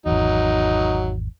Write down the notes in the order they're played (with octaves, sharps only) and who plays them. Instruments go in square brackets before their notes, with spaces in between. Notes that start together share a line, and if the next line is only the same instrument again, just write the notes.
[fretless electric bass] G#1 E2 [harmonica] F#3 D#4